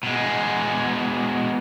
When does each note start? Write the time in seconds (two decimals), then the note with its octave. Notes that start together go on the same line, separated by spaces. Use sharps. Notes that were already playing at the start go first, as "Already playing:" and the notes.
0.04 B2 G#3